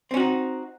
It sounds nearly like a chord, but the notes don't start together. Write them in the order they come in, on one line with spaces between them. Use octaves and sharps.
C4 C#4 F#4 D#4